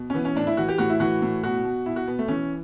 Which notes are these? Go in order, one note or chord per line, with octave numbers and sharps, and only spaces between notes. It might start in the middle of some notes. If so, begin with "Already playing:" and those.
Already playing: B2
C#4
E3 B3
C#4
A2 D4
E4
E3 F#4
G4
A2 F#4
E4
E3 F#4
A2
B2 F#4
B2
B2 E4
F#4
B2 B3
A3
E3 C#4